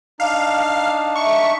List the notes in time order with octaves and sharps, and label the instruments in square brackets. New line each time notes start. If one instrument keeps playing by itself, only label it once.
[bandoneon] D4 D#4 [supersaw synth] F5
[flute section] E5 [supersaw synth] C#6